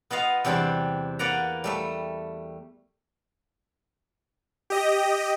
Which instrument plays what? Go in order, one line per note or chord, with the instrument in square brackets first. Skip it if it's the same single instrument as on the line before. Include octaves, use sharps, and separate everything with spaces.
[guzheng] B3 F4 D#5 F5
E2 C3 G3 C4 D4
A#3 B4 D5 F#5 A#5
G3 A3 E5
[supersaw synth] G4 D#5